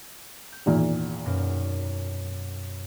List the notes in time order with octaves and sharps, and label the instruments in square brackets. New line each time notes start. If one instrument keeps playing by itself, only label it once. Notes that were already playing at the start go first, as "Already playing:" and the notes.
[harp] G6
[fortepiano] G#1 E2 A#2
[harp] F#2 B2 A#3